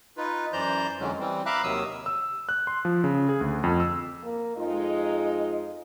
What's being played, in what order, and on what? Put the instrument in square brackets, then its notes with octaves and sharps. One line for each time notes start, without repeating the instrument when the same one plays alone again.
[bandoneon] D#4 F4 B4
F#2 E3 C5 D5 A#5 G6
F2 D3 E3 F#3 G#3 C#4
E3 G3 C4
E5 F5 A#5 B5 D6 F#6
D#2 C3 D#3 F#3 D#6 E6
[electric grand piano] E6
F#6
C6
F3
C#3
G#4
D2
F2
E6
[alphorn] A#3
[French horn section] F2 G#3 D#4 [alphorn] F4